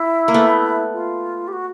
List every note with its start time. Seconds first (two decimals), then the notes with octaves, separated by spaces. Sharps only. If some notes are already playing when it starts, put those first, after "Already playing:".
Already playing: E4
0.28 A#3
0.34 A3 B3
0.94 F4
1.48 G4
1.53 F#4